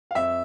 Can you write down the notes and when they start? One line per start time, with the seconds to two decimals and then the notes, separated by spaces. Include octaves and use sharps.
0.11 F5
0.15 F2 E5